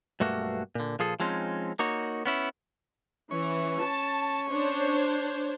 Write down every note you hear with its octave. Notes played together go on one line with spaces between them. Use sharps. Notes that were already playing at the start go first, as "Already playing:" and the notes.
B1 G2 A3 A#3 F#4
A#2 D3
A#2 F3 G#4 A4
F3 G#3 C4 C#4 D#4
A#3 D#4 F#4 C#5
B3 C#4 E4
E3 C#4 C#6
A5
D4 C5 C#5